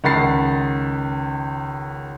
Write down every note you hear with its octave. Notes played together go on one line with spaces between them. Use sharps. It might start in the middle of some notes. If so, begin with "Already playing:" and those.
C#2 D#3 F#5 B5 A6 C7